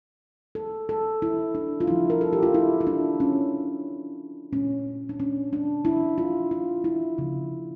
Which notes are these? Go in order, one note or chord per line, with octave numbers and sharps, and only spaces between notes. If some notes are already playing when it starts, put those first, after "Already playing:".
A4
A4
E4
D4
F4
C#3 F3 A3 E4
A#4
A4
G4
F4
E4
E4
D4
C#4
A#2 A3 C#4
D4
C#4
D4
E4
F4
F4
E4
C#3 F3 A#3